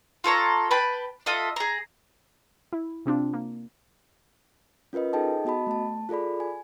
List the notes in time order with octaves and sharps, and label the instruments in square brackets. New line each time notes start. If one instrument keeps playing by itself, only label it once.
[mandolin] F4 A4 C#5 A#5
B4 G5 A5 B5
F4 A4 D#5 E5
G#4 A#5
[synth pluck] E4
C3 C4 D4 F4
A#3
[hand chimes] C#4 F4 A#4 B4 D#5
D#4 G#4 A4 D#5 G5 A5
B3 F#4 D#5 A5 B5
A3 A5
F4 G#4 A4 D5 B5
G#5